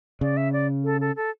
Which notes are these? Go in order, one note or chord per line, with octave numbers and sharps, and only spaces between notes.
C#3 D5
E5
D5
A4
A4
A4